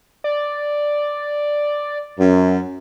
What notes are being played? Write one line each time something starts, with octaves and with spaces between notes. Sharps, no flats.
D5
F#2